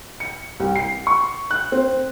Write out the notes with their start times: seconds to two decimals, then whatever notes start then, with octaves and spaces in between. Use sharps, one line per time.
0.20 C#7
0.60 C2
0.76 C7
1.07 C#6
1.51 F#6
1.72 C4